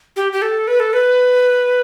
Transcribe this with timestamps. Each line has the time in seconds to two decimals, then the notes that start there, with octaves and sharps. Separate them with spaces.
0.16 G4
0.33 G4
0.42 A4
0.68 B4
0.80 A4
0.93 B4